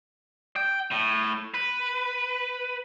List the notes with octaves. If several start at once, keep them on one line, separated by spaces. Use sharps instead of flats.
G5
A2
B4